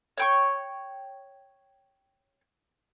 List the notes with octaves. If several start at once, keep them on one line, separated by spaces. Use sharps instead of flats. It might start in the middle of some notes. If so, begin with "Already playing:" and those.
C#5 G5 C#6